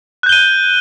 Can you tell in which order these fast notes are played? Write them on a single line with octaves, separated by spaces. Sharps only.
F#6 G6 G7 D#7